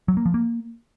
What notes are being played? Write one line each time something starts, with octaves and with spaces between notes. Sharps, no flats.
F#3
A#3
F3
A#3